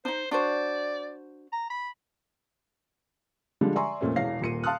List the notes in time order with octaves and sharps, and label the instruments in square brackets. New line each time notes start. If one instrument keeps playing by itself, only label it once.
[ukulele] D4 D#4 [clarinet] C5
[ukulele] D4 F#4 C5 [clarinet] D5
[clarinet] A#5
B5
[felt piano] D3 F3 G3 G#3 D4
D5 E5 G#5 A#5 C6 C#6
F2 A#2 A3 C4 C#4
E1 E2 C#5 F5 A#6 C7
D#1 A#2 C#7 D#7
F5 A5 C6 D#6 F6 F#6